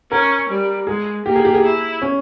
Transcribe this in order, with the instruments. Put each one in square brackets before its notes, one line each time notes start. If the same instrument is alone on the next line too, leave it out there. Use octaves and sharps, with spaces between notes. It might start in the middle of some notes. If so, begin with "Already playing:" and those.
[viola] C#4 [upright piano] A#4
[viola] G3
[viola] G#3 [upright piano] G#4
[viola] A#3 [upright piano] G4
[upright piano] G#4
G4
G#4
[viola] E4
[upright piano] C#4